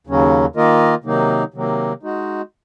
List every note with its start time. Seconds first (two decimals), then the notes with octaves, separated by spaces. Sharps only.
0.07 D#2 C#3 F#3 C#4
0.56 D#3 A#3 F4 A#4 D#5
1.04 C3 D#3 F#3 A#3 D#4
1.54 C3 D#3 F#3 A#3
2.03 G#3 D#4 F#4